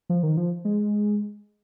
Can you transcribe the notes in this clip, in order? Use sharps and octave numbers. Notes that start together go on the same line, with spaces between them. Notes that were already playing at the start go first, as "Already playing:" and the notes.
F3
D#3
F3
G#3